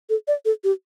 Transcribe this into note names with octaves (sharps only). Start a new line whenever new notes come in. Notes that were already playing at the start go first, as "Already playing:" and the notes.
A4
D5
A4
G4